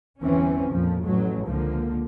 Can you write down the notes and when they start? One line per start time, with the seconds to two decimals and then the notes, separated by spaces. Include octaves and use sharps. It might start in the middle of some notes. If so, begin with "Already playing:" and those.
0.21 G1 E2 E3 C4 C#4
0.72 A#1 F2 F3
1.03 A1 F#3
1.47 C#2 D3 F3 A#3